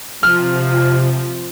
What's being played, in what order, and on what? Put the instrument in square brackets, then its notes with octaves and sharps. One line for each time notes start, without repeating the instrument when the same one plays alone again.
[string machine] C3 [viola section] F3 [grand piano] F6